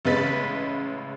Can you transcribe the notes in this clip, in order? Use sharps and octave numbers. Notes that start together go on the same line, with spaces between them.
A1 C#3 G#3 B4 A6 B6